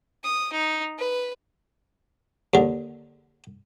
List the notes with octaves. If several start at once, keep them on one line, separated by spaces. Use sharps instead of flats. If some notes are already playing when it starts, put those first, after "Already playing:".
D#6
D#4
B4
D#2 D3